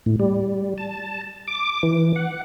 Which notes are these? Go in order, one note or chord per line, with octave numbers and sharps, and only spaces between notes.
A2
G3
A5
D6
E3
F#5